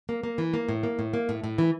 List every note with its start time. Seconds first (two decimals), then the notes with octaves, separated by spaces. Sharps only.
0.09 A#3
0.24 A#3
0.38 E3
0.54 A#3
0.69 A2
0.83 A#3
0.99 A2
1.14 A#3
1.29 A2
1.44 A2
1.58 E3